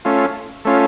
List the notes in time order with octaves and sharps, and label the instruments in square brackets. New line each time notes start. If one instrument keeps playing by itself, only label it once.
[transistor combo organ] A3 C#4 F4
A3 C#4 F4